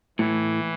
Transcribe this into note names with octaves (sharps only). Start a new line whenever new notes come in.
A2 E3